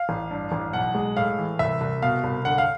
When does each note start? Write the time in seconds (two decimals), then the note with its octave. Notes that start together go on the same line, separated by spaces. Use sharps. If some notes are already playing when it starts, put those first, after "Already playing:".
Already playing: F5
0.09 A1
0.31 G2
0.52 A1
0.73 B1 F#5
0.95 G#3
1.17 A2 F5
1.38 E3
1.59 C2 E5
1.81 C2
2.02 B2 F5
2.24 C2
2.45 D3 F#5
2.58 F5